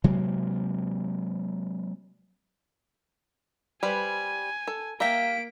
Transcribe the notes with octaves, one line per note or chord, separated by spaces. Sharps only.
C3 F#3 G#3 A#3
G3 B4 C5 G#5
A4
A#3 G4 E5 F5 A#5 B6 D7